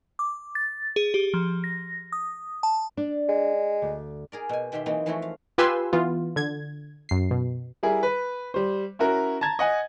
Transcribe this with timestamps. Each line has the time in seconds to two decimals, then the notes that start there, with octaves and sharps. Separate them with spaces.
0.19 D6
0.55 A6
0.96 G#4
1.14 G4
1.34 F3
1.64 A#6
2.12 D#6
2.63 A5
2.97 D4
3.28 G#3
3.82 D2
4.32 G#4 A#4 D5
4.49 B2 G#5
4.72 B2 D#3 G4 E5 C6
4.86 E3 F#3 A#3 C4 D#4
5.06 E3 F3 A3 E4 F#4 C5
5.22 F5
5.58 F4 G4 B4 G#5 C6 E6
5.93 E3 B3 F4
6.36 D3 G#6
7.09 F#2 C7
7.31 B2
7.83 G3 E4 G#4 A#4
8.03 B4
8.54 G3 C5
8.99 C#4 E4 F#4 A#4
9.41 A5 A#5 G#6 A6
9.59 D#5 F#5 G#5